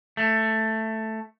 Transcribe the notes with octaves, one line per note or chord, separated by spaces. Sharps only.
A3